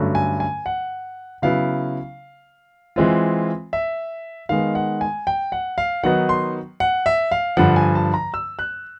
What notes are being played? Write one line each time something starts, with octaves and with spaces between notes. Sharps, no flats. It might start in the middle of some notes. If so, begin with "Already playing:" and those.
Already playing: G2 D3 F#3 A3 C#4
G#5
G#5
F#5
C#3 F#3 B3 E4 F5
E3 G#3 C4 F4
E5
D#3 G#3 B3 F5
F#5
G#5
G5
F#5
F5
D#3 F#3 B3 D#4 F#5
C6
F#5
E5
F5
G2 D3 F3 F#5
G#5
A5
A#5
E6
F#6